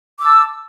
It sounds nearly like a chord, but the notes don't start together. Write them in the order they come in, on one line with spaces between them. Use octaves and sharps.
D6 E6 A5